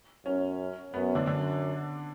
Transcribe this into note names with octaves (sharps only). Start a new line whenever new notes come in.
F#2 C#4
F#2 B3
D3 D4
F#2 D3 D4